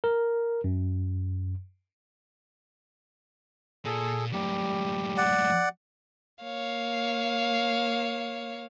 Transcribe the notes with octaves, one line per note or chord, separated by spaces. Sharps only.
A#4
F#2
A#2 G#4 A4
F#2 A2 G3 G4
D5 F#5
A#3 C#5 F5